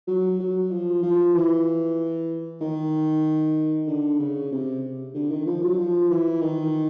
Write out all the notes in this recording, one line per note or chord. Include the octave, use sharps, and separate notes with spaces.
F#3
F#3
F3
F3
E3
D#3
D3
C#3
C3
D3
D#3
F3
F#3
F3
E3
D#3